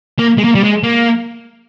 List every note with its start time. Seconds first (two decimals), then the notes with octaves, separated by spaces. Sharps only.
0.19 A#3
0.38 G#3
0.44 A#3
0.55 G3
0.64 G#3
0.84 A#3